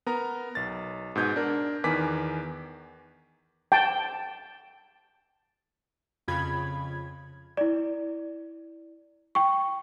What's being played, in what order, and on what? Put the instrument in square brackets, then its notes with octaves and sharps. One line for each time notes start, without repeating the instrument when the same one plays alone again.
[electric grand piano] B3 A#4 A#5
B1 A6
G#2 B2 G6 G#6
D4 A#4
E2 D#3 B4 G#5 D6 B6
[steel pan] G5 A5
[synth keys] F2 C#3 F4 B5 G#6
[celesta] E4 D5
G5 C#6